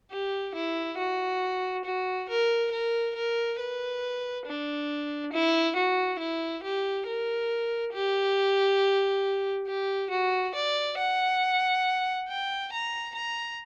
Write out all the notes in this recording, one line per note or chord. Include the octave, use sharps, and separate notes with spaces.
G4
E4
F#4
F#4
A#4
A#4
A#4
B4
D4
E4
F#4
E4
G4
A#4
G4
G4
F#4
D5
F#5
G5
A#5
A#5